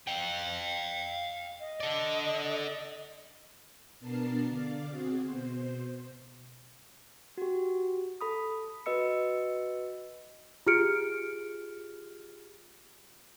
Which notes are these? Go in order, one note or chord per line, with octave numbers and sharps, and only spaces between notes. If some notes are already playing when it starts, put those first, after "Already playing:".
F5 G5
D#5
A4 D5
B2 B3 D4 A#4 A5 C7
D3 D5 F5 D6
C4 F#4 G#4
B2 C5
F#4 G4
A4 B5 D#6
F#4 B4 D#5 E6 C#7
F4 G4 G#4 F6 C#7 D7